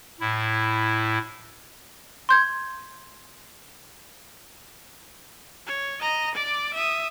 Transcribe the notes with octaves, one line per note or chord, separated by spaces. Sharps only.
A2 E4
C6 G6 G#6
C#5
D#5 A#5
D5 D6
E5 D#6